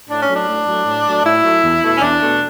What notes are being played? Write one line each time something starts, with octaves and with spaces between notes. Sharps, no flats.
A2 D4
C#4
F#3 A3
D4
A2
F#3 A3
A2
F#3 A3
A2 E4
F#3 A3
E2
B2 A3
C#4
E2 D4
B2 A3